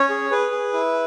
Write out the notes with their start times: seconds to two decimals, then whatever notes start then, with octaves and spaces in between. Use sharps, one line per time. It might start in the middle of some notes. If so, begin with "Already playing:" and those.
Already playing: C#4 C#5
0.10 G#4
0.31 G#4 B4
0.51 G#4
0.73 E4